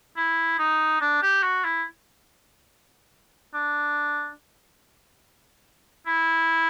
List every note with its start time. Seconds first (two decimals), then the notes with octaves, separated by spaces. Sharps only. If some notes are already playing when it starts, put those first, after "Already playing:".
0.17 E4
0.59 D#4
1.01 D4
1.22 G4
1.43 F#4
1.64 E4
3.54 D4
6.07 E4